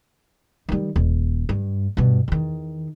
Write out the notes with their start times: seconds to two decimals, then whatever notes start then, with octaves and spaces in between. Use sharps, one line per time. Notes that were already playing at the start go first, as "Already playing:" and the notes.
0.69 D#3 G3
0.96 D#1
1.49 G2
1.97 G2 B2
2.28 E2 D#3